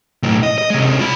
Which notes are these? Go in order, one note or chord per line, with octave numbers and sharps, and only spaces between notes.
B1 A2
D#5
D#5
C3 G#3
F4 B5